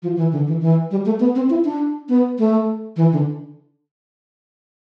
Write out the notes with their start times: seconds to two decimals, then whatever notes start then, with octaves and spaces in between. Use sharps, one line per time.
0.03 F3
0.17 E3
0.32 D3
0.47 E3
0.61 E3
0.91 G3
1.05 A3
1.20 B3
1.35 C4
1.50 E4
1.65 D4
2.09 B3
2.38 A3
2.96 E3
3.12 D3